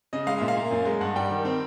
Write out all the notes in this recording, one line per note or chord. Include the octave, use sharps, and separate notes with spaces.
C#3 D#5
G#3 F5
A#2 E5
F5
A#3
F#2
G#3
G2 F#5
G3 G5
D#3
C4